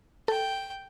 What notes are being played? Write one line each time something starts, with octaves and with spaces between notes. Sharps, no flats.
A4 G5